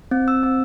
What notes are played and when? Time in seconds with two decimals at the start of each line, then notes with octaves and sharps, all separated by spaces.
0.11 C4
0.28 E6
0.43 C4